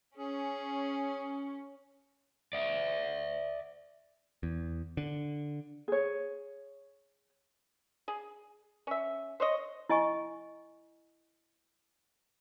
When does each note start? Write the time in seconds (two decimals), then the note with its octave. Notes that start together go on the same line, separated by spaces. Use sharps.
0.17 C#4 G#4
2.53 D5 E5
4.43 E2
4.97 D3
5.88 G#4 C#5
8.08 G#4
8.87 C#4 E5
9.40 C5 C#5 D#5
9.89 E4 D#5 G#5 C#6